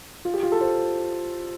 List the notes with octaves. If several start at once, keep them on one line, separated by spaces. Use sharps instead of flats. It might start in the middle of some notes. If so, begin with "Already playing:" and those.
F4
G4
F4
A4
C5